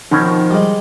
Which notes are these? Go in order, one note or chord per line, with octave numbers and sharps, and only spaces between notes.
B2 D#3 F3 C4 C#4
G3 G#3